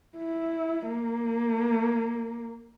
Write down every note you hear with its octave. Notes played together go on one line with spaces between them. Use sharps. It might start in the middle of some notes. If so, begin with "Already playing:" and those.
E4
A#3